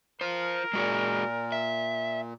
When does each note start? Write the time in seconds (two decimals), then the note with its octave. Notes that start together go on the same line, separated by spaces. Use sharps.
0.21 F4 A#4 C5
0.73 A#2 G#3 F#4 G#4
1.52 E5